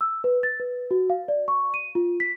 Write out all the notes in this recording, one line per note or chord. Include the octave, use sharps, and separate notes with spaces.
E6
B4
A6
B4
F#4
F5
D5
C#6
D#7
F4
B6